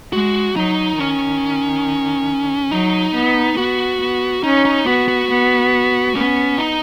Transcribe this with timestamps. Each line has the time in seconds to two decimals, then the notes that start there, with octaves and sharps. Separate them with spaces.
0.13 G#3 F#4
0.56 F#3 D#4
0.99 D#3 C#4
2.71 F#3 D#4
3.14 B3
3.57 B3 F#4
4.00 B3
4.43 C#4 D#4
4.65 D#4
4.86 B3 F#4
5.08 F#4
5.30 B3
6.16 B3 C#4
6.58 D#4